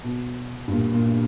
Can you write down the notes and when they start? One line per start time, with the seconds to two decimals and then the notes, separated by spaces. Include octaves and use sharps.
0.03 B2
0.68 G2
0.72 A#2
0.94 A#2